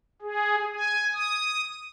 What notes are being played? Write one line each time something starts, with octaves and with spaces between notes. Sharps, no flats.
G#4
G#5
D#6